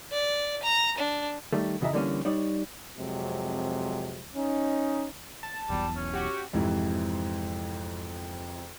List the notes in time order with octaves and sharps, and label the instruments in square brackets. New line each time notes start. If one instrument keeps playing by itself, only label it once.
[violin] D5
A#5
D4
[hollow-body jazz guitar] D#3 G3 A3
F2 C#3 E3 D#5 E5 A#5
D3 E3 G3 A#3 C4 C#4
G3 D#4 C#5 D5
[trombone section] F2 C3 F#3 G#3
C#4 D#4
[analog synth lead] A5
[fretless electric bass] E1 B1 E2 [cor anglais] G3
[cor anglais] C#4
[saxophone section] F#4 [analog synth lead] G4
[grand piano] F2 G#2 C3 E3